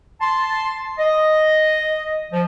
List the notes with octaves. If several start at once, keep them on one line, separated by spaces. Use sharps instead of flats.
A5 C6
D#5
F3